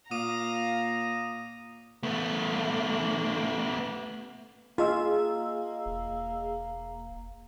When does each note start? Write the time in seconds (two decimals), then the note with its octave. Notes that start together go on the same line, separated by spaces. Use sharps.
0.11 A#2 F5 A#5 D6 D#6 D#7
2.03 A3 B3
4.78 A#3 F4 G#4 D#5 E6
5.86 E1